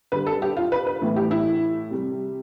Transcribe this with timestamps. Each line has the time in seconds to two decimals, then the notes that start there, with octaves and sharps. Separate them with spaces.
0.12 D3 G3 B4
0.27 A4
0.42 G4
0.57 F4
0.72 B4
0.87 B4
1.02 A2 E3 A3
1.16 G4
1.31 E4
1.91 C3 G3